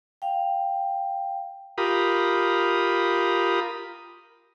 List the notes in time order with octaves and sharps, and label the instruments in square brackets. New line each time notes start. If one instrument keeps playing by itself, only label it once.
[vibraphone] F5 G5
[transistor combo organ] F4 G4 A#4 B5 D#6